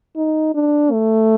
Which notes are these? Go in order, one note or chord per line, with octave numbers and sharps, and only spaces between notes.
D#4
D4
A3